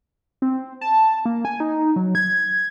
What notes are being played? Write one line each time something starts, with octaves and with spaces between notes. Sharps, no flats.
C4
A5
A#3
G#5
D#4
F#3
G#6